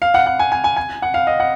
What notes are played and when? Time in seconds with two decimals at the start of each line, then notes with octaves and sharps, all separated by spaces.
0.02 F5
0.14 F#5
0.26 F#5
0.39 G#5
0.52 G#5
0.64 G#5
0.76 G#5
1.02 F#5
1.14 F5
1.27 D#5
1.40 F#5